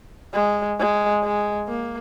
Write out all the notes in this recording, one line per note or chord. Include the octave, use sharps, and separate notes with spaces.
G#3
G#3
G#3
A#3